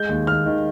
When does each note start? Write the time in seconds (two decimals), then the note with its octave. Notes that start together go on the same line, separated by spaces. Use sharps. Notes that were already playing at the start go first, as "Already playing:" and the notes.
Already playing: G#3 G6
0.09 D#2
0.27 D#2 F6
0.46 D#3